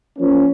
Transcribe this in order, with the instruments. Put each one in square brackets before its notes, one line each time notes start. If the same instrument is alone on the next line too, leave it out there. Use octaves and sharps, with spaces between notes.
[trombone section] F3 A#3 C#4